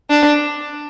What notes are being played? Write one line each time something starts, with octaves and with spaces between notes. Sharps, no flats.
D4